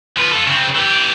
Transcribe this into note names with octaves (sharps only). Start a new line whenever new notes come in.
F3 B4
F4 A4
C#3 C4
E3 G4